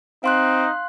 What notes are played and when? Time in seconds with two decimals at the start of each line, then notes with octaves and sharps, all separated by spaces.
0.24 C4 D#4 F5 C6 F#6